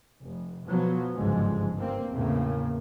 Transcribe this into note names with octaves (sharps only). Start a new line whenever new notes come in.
F1
B2 F3 F#3 B3
G1 C#2 G#2 D3 F3 G#3
G2 A#3 C4
E2 A2 C#3 A#3